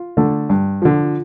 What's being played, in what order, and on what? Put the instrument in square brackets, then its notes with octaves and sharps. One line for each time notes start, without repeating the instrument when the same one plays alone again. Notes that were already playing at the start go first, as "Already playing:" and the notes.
Already playing: [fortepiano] F4
D3 A3
G2
D3 F3